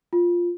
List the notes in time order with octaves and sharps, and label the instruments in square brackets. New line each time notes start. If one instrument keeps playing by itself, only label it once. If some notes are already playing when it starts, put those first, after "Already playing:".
[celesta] F4